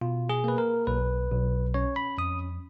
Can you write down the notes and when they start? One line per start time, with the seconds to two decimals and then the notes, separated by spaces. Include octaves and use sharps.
0.01 B2 F4
0.29 G#4
0.44 A#3 B4
0.58 A#4
0.87 B1 B4
1.31 B1
1.74 C#4 C#5
1.96 B5
2.18 F2 D#6